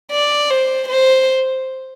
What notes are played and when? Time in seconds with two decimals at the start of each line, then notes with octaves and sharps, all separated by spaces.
0.12 D5
0.50 C5
0.88 C5